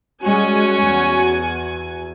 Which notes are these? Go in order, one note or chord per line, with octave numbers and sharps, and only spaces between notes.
G3 G#3 C#4 F#4 G#5
E2